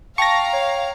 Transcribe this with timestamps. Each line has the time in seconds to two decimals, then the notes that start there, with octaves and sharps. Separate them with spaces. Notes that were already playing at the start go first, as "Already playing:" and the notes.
0.18 F5 G5 A5 A#5 C#6 A#6
0.53 C#5